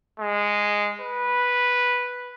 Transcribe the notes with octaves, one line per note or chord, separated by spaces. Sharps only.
G#3
B4